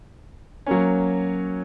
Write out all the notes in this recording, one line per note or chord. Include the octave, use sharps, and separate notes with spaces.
F#3 A#3 C#4